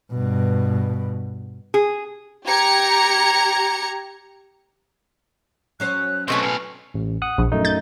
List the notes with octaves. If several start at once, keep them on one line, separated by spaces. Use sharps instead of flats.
G2 B2
G#4
G4 A#5 G#6 C#7
F#3 C#4 C5 F#6
B2 A3 C4 B4 G#5 C#6
A2 B4 F5
A1
F#5 D#6 F#6
A#1
F#2 A3 D#4
G6 A6